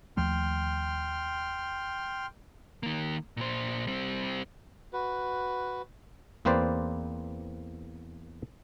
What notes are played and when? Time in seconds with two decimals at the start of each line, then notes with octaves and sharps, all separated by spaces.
0.17 D#2 F3 A3 G5 C6 F6
2.83 D#3 A#3
3.37 A#2 C5
3.87 G3 C4
4.93 F#4 B4
6.45 E2 A#3 C4 B4 C5 D5